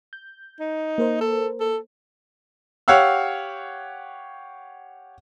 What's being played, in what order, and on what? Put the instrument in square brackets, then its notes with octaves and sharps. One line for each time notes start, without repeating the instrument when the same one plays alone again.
[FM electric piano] G6
[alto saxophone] D#4
[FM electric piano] A#3 A#4 C5
[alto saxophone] A4
A4
[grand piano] G4 C#5 F5 F#5 E6